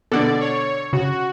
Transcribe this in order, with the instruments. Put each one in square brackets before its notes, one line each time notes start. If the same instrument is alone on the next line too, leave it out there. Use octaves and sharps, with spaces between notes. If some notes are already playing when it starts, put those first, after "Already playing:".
[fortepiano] B2 D3 [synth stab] A4 F#5 [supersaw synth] D5
[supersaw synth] C#5
[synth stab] C#3 [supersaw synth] F#4